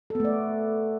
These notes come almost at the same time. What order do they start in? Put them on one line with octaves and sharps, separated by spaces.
A4 B3 A3 D5